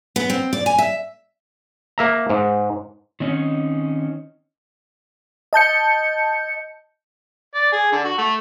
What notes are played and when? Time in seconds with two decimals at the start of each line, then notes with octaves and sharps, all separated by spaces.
0.16 B3
0.30 C4
0.53 D5
0.66 G#5
0.78 E5
1.98 A#3 E5 A#5
2.29 G#2
3.20 D#3 C4 C#4 D#4
5.53 D#5 A5 G6 C#7
7.55 D5
7.72 G#4
7.92 D3
8.05 F#4
8.18 A3